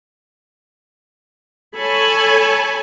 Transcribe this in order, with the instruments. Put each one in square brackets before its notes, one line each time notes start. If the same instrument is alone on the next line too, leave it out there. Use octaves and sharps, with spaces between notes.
[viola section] A4 C#5 G#5 A5 B5